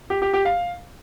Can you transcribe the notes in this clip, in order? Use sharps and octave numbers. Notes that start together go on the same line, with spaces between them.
G4
G4
G4
F5